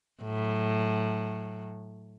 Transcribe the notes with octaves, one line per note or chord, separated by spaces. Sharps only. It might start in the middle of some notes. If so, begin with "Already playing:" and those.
A2 F#3